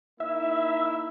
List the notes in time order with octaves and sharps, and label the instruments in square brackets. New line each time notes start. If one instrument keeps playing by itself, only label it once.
[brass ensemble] A#3 D#4 E4 [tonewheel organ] E5